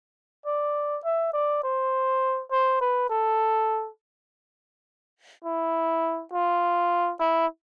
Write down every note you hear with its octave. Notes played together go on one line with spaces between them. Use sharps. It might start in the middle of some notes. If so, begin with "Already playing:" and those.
D5
E5
D5
C5
C5
B4
A4
E4
F4
E4